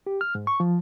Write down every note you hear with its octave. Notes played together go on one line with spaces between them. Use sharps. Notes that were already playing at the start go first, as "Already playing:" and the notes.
G4
F6
G#2
C#6
F3